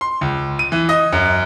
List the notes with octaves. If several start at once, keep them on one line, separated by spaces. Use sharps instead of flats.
C6
C#2
D#7
E3
D#5
F#2